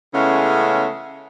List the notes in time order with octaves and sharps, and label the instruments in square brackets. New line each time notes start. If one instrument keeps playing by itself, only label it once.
[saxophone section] C#3 E3 G#3 A3 B3 C#4